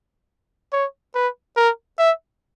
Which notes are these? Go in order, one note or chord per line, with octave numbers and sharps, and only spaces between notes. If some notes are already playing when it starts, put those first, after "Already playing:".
C#5
B4
A#4
E5